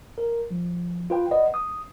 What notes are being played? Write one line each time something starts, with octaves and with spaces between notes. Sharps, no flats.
A#4
F3
F4 B4 G5
B4 D5 D#5 F#5
D#6